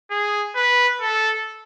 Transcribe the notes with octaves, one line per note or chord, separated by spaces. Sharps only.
G#4
B4
A4